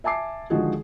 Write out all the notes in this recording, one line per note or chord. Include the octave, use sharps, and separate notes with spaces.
E5 G#5 A5 D6 C7
D3 D#3 F3 G#3 F#4 G#4